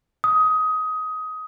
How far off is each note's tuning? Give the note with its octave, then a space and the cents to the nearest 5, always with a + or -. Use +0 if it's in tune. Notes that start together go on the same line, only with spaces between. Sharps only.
D#6 +20